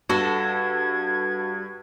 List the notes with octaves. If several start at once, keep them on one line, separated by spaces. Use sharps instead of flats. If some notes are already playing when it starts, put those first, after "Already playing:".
G2 F#4 A4 G#6